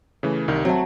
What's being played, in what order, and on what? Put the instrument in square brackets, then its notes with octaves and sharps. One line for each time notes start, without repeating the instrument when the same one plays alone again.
[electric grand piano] C#3 E3 A3
C2 D#3 G3
[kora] F#3 A3 [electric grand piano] C4